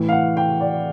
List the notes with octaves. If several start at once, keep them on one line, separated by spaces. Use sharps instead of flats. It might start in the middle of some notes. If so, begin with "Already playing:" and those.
Already playing: A2 E3
F5
F#5
G5
D5